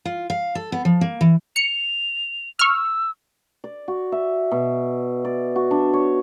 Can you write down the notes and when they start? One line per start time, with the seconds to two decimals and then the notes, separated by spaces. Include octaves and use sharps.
0.05 F4
0.30 F5
0.55 A4
0.72 B3
0.85 F3
1.01 A#3
1.21 E3
1.56 C#7 F7
2.59 C#6 E6 F6
3.64 D5
3.88 F#4
4.12 E5
4.51 B2
5.25 D5
5.56 F#4
5.71 D4
5.94 C#5